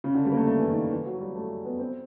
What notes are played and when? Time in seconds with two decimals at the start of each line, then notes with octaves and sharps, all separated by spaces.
0.04 C#3
0.15 D3
0.25 G3
0.32 A#3
0.37 A3
0.47 A3
0.59 E3
0.69 D#3
0.91 E3
1.06 F#3
1.21 G3
1.35 A3
1.65 B3
1.79 C4